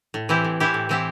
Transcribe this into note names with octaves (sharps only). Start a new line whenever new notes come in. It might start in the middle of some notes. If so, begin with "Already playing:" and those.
A2
E3 C4 E4 G4
A2
E3 C4 E4 G4
A2
E3 C4 E4 G4